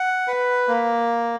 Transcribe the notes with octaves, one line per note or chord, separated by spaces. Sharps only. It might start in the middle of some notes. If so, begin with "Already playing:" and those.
Already playing: F#5
B4
A#3